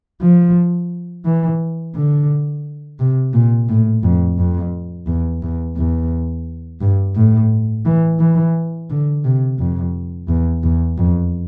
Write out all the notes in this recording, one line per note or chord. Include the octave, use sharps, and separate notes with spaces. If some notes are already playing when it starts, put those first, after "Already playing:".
F3
E3
D3
C3
A#2
A2
F2
F2
E2
E2
E2
G2
A2
E3
E3
D3
C3
F2
E2
E2
F2